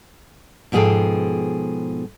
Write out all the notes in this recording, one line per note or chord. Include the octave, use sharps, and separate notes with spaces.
G#2 B2 F3 G#4 A4 G5